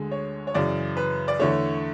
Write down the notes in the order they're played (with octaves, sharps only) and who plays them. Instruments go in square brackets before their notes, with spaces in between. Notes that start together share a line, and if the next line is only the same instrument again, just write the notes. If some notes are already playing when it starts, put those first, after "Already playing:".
Already playing: [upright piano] D2 D3 G#3
C#5
C#5
F#2 C#3 E3 D5
B4
D5
E2 D3 A3 C#5